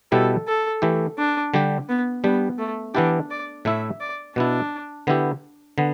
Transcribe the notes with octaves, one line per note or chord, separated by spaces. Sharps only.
B2 G3 E4 G4 A4
A4
E3 A3 E4 G4
D4
D3 G3 D4 G4
B3
G3 B3 D4 G4
A3
E3 B3 D4 E4 G4
D5
A2 A3 E4 E5
D5
B2 B3 D4 E4
D3 B3 E4 G4
D3 B3